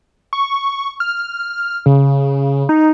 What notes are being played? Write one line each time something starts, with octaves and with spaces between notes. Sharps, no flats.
C#6
F6
C#3
D#4